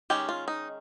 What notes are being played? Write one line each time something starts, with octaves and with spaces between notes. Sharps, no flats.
D#3 G#3 C#4 G4
F4
D#4